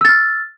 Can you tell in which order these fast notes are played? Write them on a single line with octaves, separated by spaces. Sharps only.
E6 A6 F6